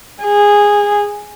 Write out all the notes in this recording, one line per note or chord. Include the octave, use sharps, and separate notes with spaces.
G#4